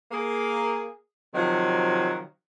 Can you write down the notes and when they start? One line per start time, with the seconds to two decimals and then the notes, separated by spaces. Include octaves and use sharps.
0.12 A#3 G#4
1.35 C3 D#3 F3 F#3